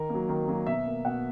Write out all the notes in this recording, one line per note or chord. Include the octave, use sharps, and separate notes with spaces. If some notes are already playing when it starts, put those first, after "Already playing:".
Already playing: D#3 A#4
F#3 A#3
D#3 A#4
F#3 A#3
B2 E5
A#3
B2 F#5